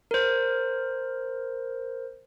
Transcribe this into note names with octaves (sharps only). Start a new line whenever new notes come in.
A#4 C5